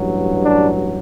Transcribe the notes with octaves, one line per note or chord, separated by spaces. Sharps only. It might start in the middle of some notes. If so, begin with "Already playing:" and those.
Already playing: A1 G2 F#3
D4